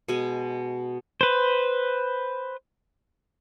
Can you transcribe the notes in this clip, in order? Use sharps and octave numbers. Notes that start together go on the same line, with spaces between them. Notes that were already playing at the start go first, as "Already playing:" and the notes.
B2 G#3 G#5
B4 C5